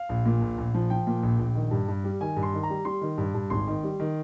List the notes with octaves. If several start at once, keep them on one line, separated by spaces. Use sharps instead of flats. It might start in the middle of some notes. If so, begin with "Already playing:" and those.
Already playing: F5
A#1
A#2
A#1
A#1
F3
F3 G5
A#2
A#1
A#1
D#3
G2
G2
G3
D#3 G#5
G2
C6
D#3
A#5
G3
G3 C6
D#3
G2
G2
G#1 C6
D#3
G3
D#3